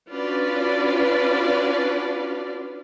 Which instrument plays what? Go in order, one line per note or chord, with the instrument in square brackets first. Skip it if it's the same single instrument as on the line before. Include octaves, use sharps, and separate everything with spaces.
[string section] C#4 D4 F4 F#4 B4 D5